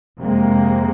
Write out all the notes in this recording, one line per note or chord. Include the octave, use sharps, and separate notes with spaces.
F2 C3 G#3 A#3